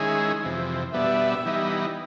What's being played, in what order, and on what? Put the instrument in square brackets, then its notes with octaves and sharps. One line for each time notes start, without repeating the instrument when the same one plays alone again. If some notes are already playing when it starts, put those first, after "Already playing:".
Already playing: [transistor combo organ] D#3 G#3 C#4 E4 G#4
F2 C3 E3
[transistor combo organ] B2 G3 B3 D4 [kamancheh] E5
[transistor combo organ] E3 G3 B3 D#4